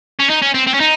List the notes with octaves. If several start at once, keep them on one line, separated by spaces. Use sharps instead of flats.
C#4
D#4
C#4
C4
C4
C#4
D#4